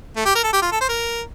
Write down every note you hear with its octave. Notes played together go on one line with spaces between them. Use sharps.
A3
G4
A#4
A4
G4
F4
A4
C5
A#4